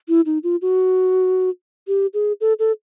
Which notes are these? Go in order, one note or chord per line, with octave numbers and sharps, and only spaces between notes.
E4
D#4
F4
F#4
G4
G#4
A4
A4